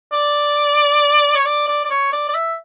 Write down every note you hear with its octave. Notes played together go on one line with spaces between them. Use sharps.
D5
C#5
D5
D5
D5
C#5
D5
D5
E5